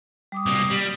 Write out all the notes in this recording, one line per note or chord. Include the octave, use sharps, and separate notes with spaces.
G3 D6 D#6
C3 A#3
G3